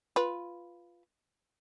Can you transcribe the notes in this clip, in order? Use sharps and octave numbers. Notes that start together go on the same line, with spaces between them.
F4 B4